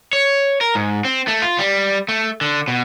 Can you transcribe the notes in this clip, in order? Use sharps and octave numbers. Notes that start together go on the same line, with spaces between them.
C#5
A#4
G#2
C4
A3
F4
G3
A3
D3
B2